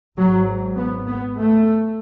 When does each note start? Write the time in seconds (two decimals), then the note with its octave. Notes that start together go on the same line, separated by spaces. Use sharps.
0.18 G#1 G#2 F#3
0.77 B3
1.07 B3
1.37 A3